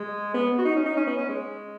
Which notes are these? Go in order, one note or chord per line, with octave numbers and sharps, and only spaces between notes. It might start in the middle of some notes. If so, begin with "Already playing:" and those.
Already playing: G#3
B3
F#4
D#4
C#4
D#4
C#4
B3
C#4
G#3